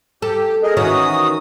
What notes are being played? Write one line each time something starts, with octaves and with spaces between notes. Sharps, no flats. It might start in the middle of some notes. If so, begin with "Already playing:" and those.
G4 A4
G#4 A#4 D#5
D#3 E3 C#4 F#4 D#6